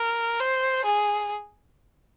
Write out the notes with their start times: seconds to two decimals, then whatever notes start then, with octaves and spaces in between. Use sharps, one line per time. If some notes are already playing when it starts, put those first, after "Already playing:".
Already playing: A#4
0.40 C5
0.85 G#4